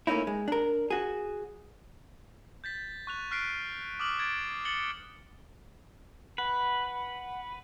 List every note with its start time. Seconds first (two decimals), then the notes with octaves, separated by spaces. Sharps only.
0.07 A3 A#3 C4 C#4 D#4 E4
0.27 G#3
0.48 D4 A#4
0.90 F#4 G#4
2.64 G6 A6 B6
3.07 C#6 F#6 F7
3.31 C#6 F6 F#6 B6 C7 D7
4.00 D6 D#6 F6 F#7
4.19 G#6 A6 D7
4.65 A6 C#7 F#7 G7
6.38 B4 F#5